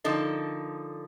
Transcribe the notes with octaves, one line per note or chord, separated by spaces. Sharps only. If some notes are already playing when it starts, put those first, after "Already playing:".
D3 F3 D#4 A4 A#4